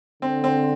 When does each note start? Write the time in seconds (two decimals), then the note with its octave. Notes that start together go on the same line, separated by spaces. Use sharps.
0.22 D3 C4
0.44 C4